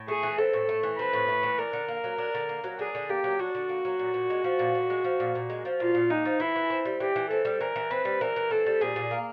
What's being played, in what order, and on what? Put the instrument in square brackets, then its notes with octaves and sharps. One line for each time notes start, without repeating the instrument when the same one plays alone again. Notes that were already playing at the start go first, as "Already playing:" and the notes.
Already playing: [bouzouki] A2
[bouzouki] A3 [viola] G#4
[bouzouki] E3
[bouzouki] C4 [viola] A4
[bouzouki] A2
A3
E3
[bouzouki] C4 [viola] B4
[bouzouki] A2
A3
E3
[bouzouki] D4 [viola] A#4
[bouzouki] D3
A#3
F#3
D4
D3
A#3
F#3
[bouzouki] D4 [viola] G#4
[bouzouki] D3
[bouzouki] A#3 [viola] G4
[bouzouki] F#3
[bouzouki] D4 [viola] F#4
[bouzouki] D3
A#3
F#3
A#2
A#2
G#3
F3
A#2
A#2
G#3
F3
A#2
A#2
G#3
F3
[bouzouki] A#2 [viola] F4
[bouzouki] A#2
[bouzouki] G#3 [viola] D#4
[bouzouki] F3
[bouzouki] E3 [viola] E4
[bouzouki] E3
C4
G3
[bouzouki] E3 [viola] G4
[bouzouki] E3
[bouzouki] C4 [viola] A4
[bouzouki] G3
[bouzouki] E3 [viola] A#4
[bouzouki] E3
[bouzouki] C4 [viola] B4
[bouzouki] G3
[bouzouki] E3 [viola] A#4
[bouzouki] E3
[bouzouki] C4 [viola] A4
[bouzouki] G3
[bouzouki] A#2 [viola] G#4
[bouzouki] A#2
A#3